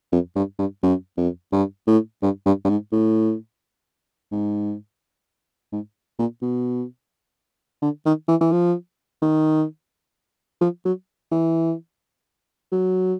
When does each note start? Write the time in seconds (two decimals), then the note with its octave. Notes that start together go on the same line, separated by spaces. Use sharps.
0.12 F2
0.36 G2
0.59 G2
0.83 F#2
1.17 F2
1.52 G2
1.87 A2
2.23 G2
2.46 G2
2.65 G2
2.69 G#2
2.92 A2
4.32 G#2
5.72 G#2
6.19 A#2
6.42 B2
7.82 D3
8.05 D#3
8.28 E3
8.41 E3
8.52 F3
9.22 D#3
10.61 F3
10.85 F#3
11.31 E3
12.72 F#3